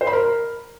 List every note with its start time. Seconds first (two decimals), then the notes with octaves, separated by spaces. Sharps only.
0.01 C5
0.07 B5
0.13 A#4